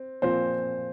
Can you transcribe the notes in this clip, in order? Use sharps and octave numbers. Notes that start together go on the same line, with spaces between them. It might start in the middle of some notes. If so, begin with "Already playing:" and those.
Already playing: C4
A#2 F3 C4 C5